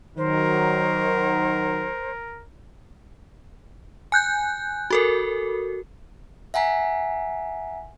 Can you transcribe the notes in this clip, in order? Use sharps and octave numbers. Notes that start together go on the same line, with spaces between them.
D#3 F#3 A#4 C5
G#5 F#6 G6
F#4 A4 A#4
E5 F#5 G#5 A#5 B6